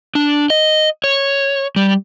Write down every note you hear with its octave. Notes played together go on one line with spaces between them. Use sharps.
D4
D#5
C#5
G3